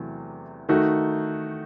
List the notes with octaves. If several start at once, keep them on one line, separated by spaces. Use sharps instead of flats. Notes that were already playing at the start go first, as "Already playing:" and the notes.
Already playing: E2 C3 F#3 A3
D#3 A3 D#4 F#4